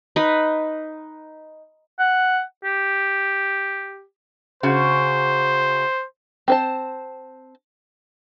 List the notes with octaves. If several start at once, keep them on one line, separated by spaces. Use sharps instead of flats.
D#4 B4
F#5
G4
C#3 F#4 C5
C4 C5 A5